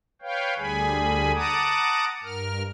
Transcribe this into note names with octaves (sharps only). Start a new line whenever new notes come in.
B4 C#5 F5 G5
D2 D3 G3 G#4 G#5 B5
F#5 A5 A#5 D6 D#6
G2 A#4 F6